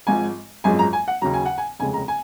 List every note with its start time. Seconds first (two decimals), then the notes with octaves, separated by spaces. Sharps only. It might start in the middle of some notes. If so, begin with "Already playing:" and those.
0.07 G#1 G#2 F3 G#5
0.64 G#1 F#2 F3 G#3 G#5
0.79 A#5
0.93 G#5
1.08 F#5
1.22 D#2 C#3 F#3 A#5
1.34 G#5
1.45 F#5
1.58 G#5
1.79 F1 D#2 C#3 G#3 G#5
1.94 A#5
2.08 G#5